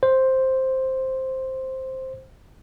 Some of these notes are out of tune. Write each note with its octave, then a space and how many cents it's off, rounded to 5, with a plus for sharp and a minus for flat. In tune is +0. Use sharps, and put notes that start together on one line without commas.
C5 +5